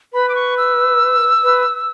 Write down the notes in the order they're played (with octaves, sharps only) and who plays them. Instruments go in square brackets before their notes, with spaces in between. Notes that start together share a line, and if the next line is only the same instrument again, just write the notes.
[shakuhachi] B4 [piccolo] B5
[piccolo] D6
C#6
E6
[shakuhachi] B4